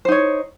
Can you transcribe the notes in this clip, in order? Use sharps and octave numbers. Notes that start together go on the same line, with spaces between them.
D#4 C5 C#5